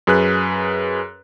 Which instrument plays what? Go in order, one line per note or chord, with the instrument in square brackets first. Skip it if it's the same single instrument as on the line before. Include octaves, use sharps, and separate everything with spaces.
[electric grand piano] F#2 G#4 B4 F#6